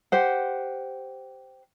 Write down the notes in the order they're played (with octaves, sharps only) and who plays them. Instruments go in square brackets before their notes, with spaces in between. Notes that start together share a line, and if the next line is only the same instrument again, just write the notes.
[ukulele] G4 C5 F#5